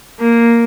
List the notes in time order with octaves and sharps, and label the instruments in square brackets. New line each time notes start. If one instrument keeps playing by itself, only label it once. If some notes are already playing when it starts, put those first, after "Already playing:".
[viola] A#3